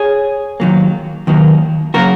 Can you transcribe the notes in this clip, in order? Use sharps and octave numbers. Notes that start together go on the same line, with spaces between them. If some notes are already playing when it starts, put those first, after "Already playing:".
Already playing: G#4 C#5
D#2 D#3 F#3 A#3
D#2 D#3 F#3 A#3
C#3 F#3 A#3 F#4 A#4